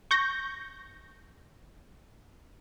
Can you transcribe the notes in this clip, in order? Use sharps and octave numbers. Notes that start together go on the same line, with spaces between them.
C#6 G6 A#6